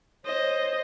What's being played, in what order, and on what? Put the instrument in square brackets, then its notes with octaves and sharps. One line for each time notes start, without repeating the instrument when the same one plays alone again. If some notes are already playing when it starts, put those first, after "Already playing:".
[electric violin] C5 D#5 [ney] C#5